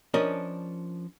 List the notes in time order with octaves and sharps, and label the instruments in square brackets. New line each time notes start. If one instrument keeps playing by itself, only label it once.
[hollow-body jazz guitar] F3 C#4 D4 A#4 D#5